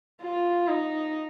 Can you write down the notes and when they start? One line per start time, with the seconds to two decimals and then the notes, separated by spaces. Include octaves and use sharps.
0.22 F4
0.68 D#4